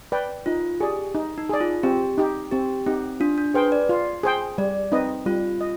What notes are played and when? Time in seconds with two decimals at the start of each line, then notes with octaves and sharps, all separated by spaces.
0.12 B4 D5 G5
0.46 D#4 F4
0.80 G4 G#4 D5
1.15 D#4
1.38 D#4
1.49 G#4 D5
1.61 F4
1.83 C4 G4
2.18 D#4 G4
2.52 C4 G4
2.86 C4 D#4 G4
3.20 D4 F4
3.38 D4
3.54 G#4 B4 C5 G5
3.72 D5
3.89 F4
4.23 G#4 C5 G5
4.58 G3 D5
4.92 C4 D#4 B4 D#5
5.26 G3 F4
5.61 D#5